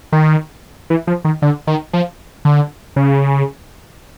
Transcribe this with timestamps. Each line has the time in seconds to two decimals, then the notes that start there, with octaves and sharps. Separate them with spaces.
0.12 D#3
0.90 E3
1.07 F3
1.25 D#3
1.42 D3
1.67 D#3
1.93 F3
2.45 D3
2.96 C#3